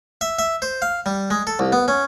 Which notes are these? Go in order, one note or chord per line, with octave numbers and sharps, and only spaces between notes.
E5
E5
C5
F5
G3
G#3
A4
C2
B3
C#4